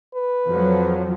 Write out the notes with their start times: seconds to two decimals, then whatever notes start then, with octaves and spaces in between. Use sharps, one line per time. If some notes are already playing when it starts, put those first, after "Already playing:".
0.14 B4
0.47 F2 F3 F#3